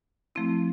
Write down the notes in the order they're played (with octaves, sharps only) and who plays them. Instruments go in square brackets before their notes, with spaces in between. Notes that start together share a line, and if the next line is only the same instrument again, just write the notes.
[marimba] F3 A3 C4 E4